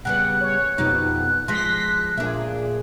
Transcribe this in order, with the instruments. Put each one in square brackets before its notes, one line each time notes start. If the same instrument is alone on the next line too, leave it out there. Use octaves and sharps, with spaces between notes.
[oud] C#3 G3 B3 [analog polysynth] F#5 [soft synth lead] F#6
[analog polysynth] C#5
[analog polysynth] F2 B2 [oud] D#4 G4
[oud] F3 G#3 [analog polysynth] C6 A#6 B6
[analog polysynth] A#2 G#4 [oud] D4 E5